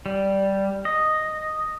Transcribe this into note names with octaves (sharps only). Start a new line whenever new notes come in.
G3
D#5